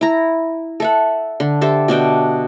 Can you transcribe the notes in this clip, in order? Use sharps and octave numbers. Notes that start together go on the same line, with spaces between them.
E4 A#5
A4 E5 F#5
D3
G4 A4 C5 E5
B2 D4 E5 G5